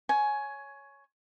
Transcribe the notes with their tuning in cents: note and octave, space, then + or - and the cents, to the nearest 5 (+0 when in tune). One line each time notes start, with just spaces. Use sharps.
C#5 +0 G#5 +15